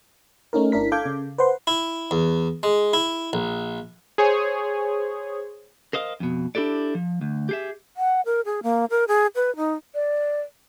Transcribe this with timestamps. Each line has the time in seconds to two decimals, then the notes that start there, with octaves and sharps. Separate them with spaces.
0.53 A3 C#4 D#4 A#4
0.72 G1 D4 E4 A#4 B6
0.92 A4 F5 D6 G6 G#6
1.06 C#3
1.38 B4 C5 F#5 C6
1.67 E4
2.11 E2
2.63 G#3
2.93 E4
3.33 A#1
4.18 G#4 C5 C#5 G#5
5.93 A#4 C5 D#5 F5
6.20 F2 B2
6.55 D4 E4 G4 A4 D5
6.95 F3
7.21 D2
7.49 G4 G#4 E5
7.97 F#5
8.25 A#4
8.45 G#4
8.63 A#3
8.90 A#4
9.08 G#4
9.35 B4
9.56 D#4
9.95 D5